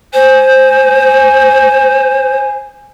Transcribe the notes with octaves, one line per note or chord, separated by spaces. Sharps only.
C5 G#5